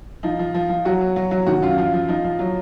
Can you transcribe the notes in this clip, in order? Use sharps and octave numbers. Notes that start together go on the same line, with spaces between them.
F3 D#4
F3
F3
F3
F#3 F#4
F#3
F#3
F#3
D#3 F#4
F#2 F4
F3 F4
F3
F3 D#4
F3
F#3